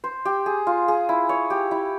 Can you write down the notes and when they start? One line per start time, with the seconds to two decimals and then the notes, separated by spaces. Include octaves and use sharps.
0.04 C5
0.25 G4
0.46 G#4
0.67 F4
0.88 G#4
1.09 E4
1.29 C#5
1.50 G4
1.71 E4